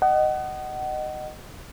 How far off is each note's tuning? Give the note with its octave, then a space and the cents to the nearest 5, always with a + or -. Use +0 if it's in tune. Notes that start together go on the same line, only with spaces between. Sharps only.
D#5 -15 F#5 +30